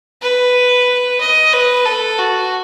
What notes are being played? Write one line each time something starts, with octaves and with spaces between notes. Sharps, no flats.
B4
D#5
B4
A4
F#4